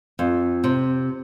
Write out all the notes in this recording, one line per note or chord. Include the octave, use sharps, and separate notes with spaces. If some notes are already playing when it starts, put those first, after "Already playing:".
F2
C3